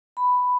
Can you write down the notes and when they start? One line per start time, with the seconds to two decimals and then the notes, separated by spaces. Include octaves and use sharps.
0.17 B5